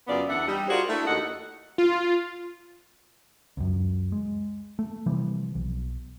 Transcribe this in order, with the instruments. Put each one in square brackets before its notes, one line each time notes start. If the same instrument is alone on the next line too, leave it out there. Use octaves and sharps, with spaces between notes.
[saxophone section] F#2 C#3 B3 F4 D5
E2 D4 E5 F#5
G3 D#4
F4 F#4 G#4 A#4 C5 D5
A3 D4 E4
D#2 F#4 D#5 F#5
[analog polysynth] F4
[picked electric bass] C#2 F#2
G#3
A3
C3 E3 F3 G3
B1